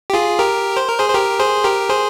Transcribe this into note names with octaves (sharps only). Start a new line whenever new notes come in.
G4
F4 G#4
G4 A#4
C5
A#4
G#4 C5
C5
G4 A#4
G#4 C5
G4 A#4
G#4 C5